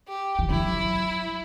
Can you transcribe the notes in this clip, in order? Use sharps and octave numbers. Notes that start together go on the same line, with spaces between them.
G4
E3
F#3 E4